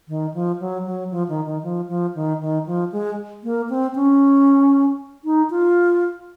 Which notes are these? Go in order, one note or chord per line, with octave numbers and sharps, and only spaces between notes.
D#3
F3
F#3
F#3
F3
D#3
D#3
F3
F3
D#3
D#3
F3
G#3
A#3
C4
C#4
D#4
F4